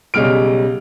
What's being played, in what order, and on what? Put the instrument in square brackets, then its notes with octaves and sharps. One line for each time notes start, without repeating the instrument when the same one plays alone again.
[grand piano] B1 C#3 G3 F6 D7